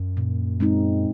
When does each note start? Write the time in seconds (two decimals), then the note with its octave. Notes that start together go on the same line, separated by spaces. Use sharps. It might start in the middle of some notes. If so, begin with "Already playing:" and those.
Already playing: F#2
0.17 A#2
0.60 G#3 C4 D#4